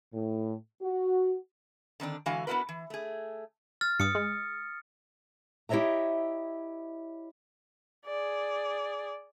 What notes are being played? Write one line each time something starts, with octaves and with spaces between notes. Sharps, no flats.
A2
F#4
D3 D#3 C4 D4
D3 E3 G#3 F#4 F5 G#5
B3 D4 E4 F#4 A#4 B4
E3
A3 G#4
F6 A6
G2 D#6 C#7
G#3
E4 G4 C#5 D#5 E5 A#5
G#4 D5